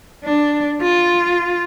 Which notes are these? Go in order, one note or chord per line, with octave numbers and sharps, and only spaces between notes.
D4
F4